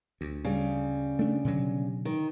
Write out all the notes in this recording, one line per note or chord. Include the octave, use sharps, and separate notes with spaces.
D2
C#3 G3
A3 D4
B2 D3 F#3
D#3